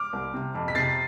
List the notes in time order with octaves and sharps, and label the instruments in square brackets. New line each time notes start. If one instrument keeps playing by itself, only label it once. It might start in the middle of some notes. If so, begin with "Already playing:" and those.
Already playing: [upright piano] D6 F6
C2
C3
F2
B6
C3 A6 C7